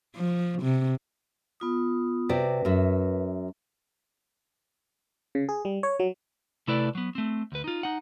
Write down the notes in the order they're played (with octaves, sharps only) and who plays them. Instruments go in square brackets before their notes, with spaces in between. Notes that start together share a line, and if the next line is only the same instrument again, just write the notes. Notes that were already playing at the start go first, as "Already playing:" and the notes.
[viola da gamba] F3
C3
[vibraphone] B3 F4 D#6
[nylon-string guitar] C3 F#4 D5 [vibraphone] B4
[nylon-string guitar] F#2 F#4 E5
[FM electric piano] C#3
G#4
G3
C#5
F#3
[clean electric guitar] C3 A3 E4 A4 B4 D5
F#3 B3
A3 C4
D2 B4
D#4 F4
D#4 F#5